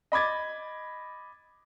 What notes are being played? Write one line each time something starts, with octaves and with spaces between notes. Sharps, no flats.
D#5 B5 D6 G#6 A6